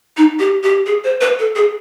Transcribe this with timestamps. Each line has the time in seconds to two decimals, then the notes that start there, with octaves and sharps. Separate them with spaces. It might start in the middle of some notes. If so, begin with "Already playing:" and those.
0.17 D#4
0.39 G4
0.64 G4
0.86 G#4
1.04 C5
1.21 B4
1.39 A4
1.56 G#4